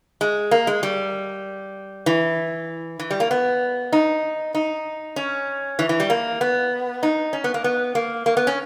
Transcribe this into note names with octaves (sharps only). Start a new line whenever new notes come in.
G#3
A#3
G#3
G3
E3
E3
G3
A#3
B3
D#4
D#4
C#4
E3
E3
G3
A#3
B3
D#4
C#4
B3
A#3
B3
A#3
A#3
B3
C#4